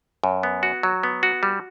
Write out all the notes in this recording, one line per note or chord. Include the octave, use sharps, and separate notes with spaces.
F#2
B3
F#4
F#3
B3
F#4
G3